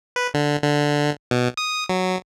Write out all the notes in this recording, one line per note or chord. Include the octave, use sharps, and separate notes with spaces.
B4
D3
D3
B2
D#6
F#3